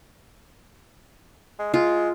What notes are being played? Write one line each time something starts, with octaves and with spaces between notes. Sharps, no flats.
G#3
G#3 F4